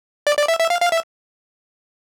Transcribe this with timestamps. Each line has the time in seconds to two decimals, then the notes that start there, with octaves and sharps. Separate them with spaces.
0.27 D5
0.37 D5
0.48 E5
0.59 E5
0.70 F5
0.81 F5
0.92 E5